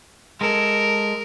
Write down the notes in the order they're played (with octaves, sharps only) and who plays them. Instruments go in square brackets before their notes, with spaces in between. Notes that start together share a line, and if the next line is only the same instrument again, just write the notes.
[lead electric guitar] G#3 A4 [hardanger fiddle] A#4